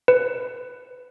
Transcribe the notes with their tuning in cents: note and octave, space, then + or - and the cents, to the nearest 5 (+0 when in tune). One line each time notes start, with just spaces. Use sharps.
B4 +15